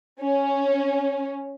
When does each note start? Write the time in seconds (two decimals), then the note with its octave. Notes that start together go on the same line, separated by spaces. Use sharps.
0.22 C#4